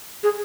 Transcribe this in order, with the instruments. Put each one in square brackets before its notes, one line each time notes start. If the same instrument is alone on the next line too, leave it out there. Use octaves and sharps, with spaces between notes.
[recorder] G#4